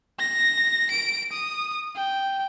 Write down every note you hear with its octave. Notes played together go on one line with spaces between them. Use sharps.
A#6
D7
D#6
G5